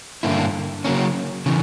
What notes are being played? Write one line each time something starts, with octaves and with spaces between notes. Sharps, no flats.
G2 D3 A#3 E4
C#3 F#3 A#3 C#4
C#3 E3